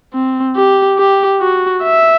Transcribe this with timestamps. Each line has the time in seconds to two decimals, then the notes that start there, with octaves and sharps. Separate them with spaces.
0.14 C4
0.56 G4
0.98 G4
1.41 F#4
1.83 E5